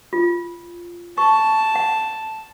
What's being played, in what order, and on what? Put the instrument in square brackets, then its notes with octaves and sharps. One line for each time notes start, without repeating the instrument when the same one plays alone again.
[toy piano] F4
[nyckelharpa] A5 [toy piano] C#6
[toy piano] F#5